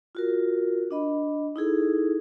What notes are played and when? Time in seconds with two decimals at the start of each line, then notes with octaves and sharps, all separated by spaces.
0.15 F4 F#4 A#4
0.91 D4 D#5 B5
1.56 D#4 E4 G#4 A4